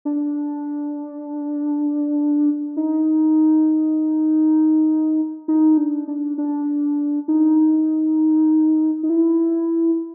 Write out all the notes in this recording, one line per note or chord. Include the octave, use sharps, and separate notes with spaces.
D4
D#4
D#4
D4
D4
D4
D#4
D#4
E4